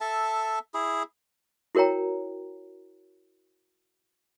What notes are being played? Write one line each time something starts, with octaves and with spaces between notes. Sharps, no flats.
A4 E5 A5
E4 G#4
E4 F#4 A#4 C#5 G5 A#5